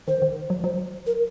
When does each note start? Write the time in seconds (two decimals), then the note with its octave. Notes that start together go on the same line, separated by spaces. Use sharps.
0.08 D#3 C5
0.22 D#3
0.50 F#3
0.64 F#3 C5
1.07 A#4